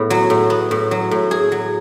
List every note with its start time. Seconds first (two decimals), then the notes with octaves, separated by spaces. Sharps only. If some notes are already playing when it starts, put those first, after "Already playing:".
Already playing: A2 B3
0.10 F#3
0.30 A2
0.50 B3
0.71 A2
0.91 F#3
1.11 A2
1.31 G#4
1.52 F#3